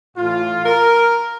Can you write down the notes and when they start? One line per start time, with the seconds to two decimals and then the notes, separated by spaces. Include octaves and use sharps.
0.16 A2 E3 A3 F4
0.65 A#4